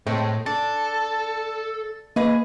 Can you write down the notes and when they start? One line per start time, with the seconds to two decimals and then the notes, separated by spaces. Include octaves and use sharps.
0.07 A2 G#3 A3 C4
0.46 D4 A4 A6
2.16 A#3 G#4 B4 D#5